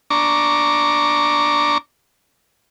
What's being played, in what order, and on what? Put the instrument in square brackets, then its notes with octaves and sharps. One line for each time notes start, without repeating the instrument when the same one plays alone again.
[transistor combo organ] D4 A#5 C#6 D6